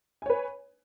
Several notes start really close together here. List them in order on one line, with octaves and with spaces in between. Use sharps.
G#5 C#5 B4